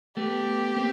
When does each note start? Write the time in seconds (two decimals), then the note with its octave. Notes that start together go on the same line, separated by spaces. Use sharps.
0.17 A3 B3 G4
0.76 A#3 C4